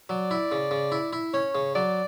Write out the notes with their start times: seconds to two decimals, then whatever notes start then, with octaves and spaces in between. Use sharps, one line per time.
0.09 F#3 D5
0.31 E4
0.52 C#3
0.71 C#3
0.92 E4
1.13 E4
1.33 C#4 C#5
1.55 C#3
1.75 F#3 D5